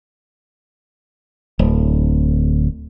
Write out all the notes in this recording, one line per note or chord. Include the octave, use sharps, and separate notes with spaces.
D1